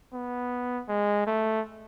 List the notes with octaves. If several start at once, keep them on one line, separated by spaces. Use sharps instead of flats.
B3
G#3
A3